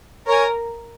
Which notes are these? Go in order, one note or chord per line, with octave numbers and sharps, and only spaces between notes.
A#4 C#5 G#5